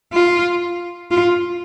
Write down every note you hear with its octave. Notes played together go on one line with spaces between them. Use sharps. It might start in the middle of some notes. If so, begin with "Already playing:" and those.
F4
F4